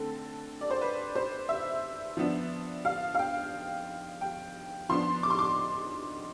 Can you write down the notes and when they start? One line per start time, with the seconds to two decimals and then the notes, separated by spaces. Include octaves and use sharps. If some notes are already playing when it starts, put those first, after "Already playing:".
Already playing: D3 A3 C4 A4
0.61 D5
0.71 C5
0.81 B4
1.15 C5
1.49 E5
2.17 F3 B3 D4
2.85 F5
3.15 F5
3.19 G5
4.21 G5
4.89 F3 B3 D4 C6
5.23 D6
5.30 C6
5.39 D6